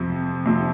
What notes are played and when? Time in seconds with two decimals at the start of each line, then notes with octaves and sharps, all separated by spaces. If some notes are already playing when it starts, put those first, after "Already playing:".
Already playing: F2 C3 F3
0.46 F2 C3 F3